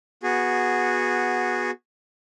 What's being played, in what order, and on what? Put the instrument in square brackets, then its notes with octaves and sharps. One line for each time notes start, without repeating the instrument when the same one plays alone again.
[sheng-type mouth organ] B3 F#4 G#4